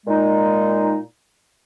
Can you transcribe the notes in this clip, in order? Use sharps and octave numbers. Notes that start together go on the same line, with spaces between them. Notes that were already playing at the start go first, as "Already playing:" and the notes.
A#2 G#3 D#4